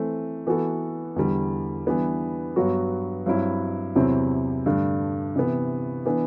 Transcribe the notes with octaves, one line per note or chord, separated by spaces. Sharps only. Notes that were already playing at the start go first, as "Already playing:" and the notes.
Already playing: E3 A3 C4
E3 B3 F#4 A4
E2 D3 G3
E3 G3 B3 D4
G2 F#3 B3 F#4
G2 F#3 C4 E4
E2 C3 F#3 C4 E4
G2 D3 A3 D4
C3 E3 B3
E3 B3 D4